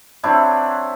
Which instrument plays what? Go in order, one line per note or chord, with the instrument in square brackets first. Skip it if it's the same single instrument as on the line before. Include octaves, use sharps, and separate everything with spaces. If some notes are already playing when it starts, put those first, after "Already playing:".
[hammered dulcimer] F#3 C4 D4 E4